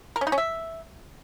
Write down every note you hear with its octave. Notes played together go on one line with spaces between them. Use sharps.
A#4
C#4
D#4
C#4
E5